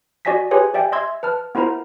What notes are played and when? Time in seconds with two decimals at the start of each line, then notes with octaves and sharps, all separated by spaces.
0.25 F#4 D5 D#5 G#5 A#6 B6
0.51 F4 G4 G#4 B4 C#5 G#5
0.74 G4 D5 E5 G5 G#5
0.92 D#5 E5 C6 E6 G#6
1.23 B4 A5 F6
1.55 B3 E4 F4 A#4 C5 A#5